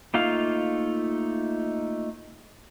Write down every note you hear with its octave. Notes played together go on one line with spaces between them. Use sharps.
A3 A#3 D#4 F4 F5